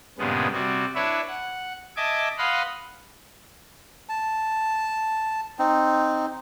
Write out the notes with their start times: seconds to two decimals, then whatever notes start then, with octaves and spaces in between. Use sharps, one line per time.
0.18 G2 A#2 C#3 G#3 B3
0.53 C3 G3 F#4
0.95 D4 E4 B4 C#5 E5
1.27 F#5
1.96 D#5 E5 G#5 A5 D6
2.38 B4 D#5 F5 F#5 B5 C6
4.09 A5
5.59 C4 D#4